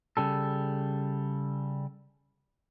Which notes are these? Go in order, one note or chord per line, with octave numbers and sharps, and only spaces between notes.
C#3 G3 A4